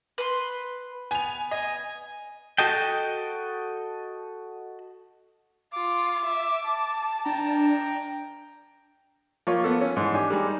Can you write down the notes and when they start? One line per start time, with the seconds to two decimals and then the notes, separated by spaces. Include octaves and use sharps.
0.18 B4 C6
1.11 B3 G#5 F7
1.51 D#5 G#5
2.58 F#4 A4 D#5 G5
5.74 F4 D6
6.25 E5
6.65 A5
7.26 D4 G5 A#5
9.47 F3 A#3 F4 C#5 C#6
9.64 B3 F4 A4
9.81 C#4
9.96 G#2 E3
10.13 D4 G4 G#5
10.30 G3 G#3 D#4